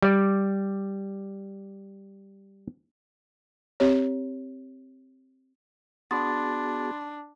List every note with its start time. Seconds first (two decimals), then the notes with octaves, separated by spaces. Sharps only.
0.02 G3 D5
3.80 C4 G4 C#5
6.11 B3 D4 F#4 G#4 B5 C6 A6